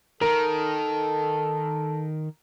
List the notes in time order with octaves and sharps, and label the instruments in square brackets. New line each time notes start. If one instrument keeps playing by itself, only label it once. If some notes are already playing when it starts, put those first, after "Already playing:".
[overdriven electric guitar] D#3 [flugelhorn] A4 [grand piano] A#4